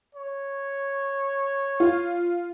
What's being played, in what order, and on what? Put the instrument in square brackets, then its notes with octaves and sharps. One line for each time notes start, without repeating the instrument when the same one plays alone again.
[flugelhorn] C#5
[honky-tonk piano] F4